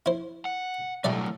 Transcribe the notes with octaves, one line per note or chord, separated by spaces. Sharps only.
E4 C5
F#5
A2 F#3 G3 A3 D5